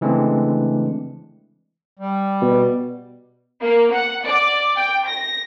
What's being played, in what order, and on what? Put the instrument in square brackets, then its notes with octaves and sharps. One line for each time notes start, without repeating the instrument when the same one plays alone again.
[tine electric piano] C#3 E3 G#3 A3 C4 D4
[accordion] G3
[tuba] B2
[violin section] A#3
F#5
D5
G5
A#6